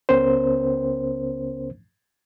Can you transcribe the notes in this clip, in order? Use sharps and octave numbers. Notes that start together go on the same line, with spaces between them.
C#2 C#3 B3 C#4 A#4 C5